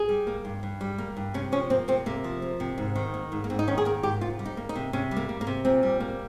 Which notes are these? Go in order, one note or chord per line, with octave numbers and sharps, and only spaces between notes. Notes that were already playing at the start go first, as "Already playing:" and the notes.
Already playing: G#4
G3
A#3
G2
G2
G3
A#3
G2
C3 C#4
F3 C#4
A#3 C4
C3 C4
C3 A#3
F3
A#3
C3
G#2
D#3
A#3
G#2
A#3
G#2 C4
D#4
D#3 C#4
G#4
A#3 A#4
G#2 G4
C3 F4
G3
D#4
A#3
D#4
C3
C3 C#4
G3
A#3
A#3
A#3
C3
A#2 C4
G3
A#3